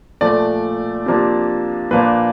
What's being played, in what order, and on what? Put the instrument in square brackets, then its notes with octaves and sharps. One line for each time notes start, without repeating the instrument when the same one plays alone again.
[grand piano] A#2 F3 A3 D5
C3 F3 A#3 D4
A#2 F3 A#3 D4 B4